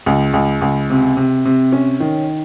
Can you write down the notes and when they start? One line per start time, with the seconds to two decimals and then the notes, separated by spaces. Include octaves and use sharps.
0.06 C#2
0.33 C#2
0.62 C#2
0.90 C3
1.17 C3
1.45 C3
1.72 C#4
2.00 D#3